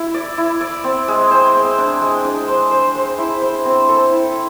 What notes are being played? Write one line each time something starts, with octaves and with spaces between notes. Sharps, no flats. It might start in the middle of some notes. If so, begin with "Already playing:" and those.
Already playing: E4
D5
E4
D5
C4
G#3
C5
C4
D4
G#3
D4
C5
C5
C5
E4
C5
C4
A4
E4